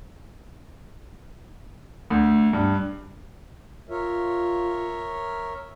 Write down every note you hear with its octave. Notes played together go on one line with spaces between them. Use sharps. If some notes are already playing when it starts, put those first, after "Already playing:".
D2
G2
F4 A#4 C#5 E5